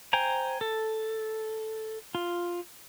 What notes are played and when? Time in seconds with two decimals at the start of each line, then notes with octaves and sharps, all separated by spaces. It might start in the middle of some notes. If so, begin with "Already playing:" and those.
0.13 C5 G5 G#5 A#5
0.61 A4
2.15 F4